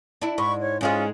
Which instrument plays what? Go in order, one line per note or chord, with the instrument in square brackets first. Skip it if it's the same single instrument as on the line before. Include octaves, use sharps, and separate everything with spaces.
[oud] D4 E4
[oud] G#2 [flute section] B5 C#6
[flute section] C#5
[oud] G#2 G#3 G#4 [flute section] C#4 F4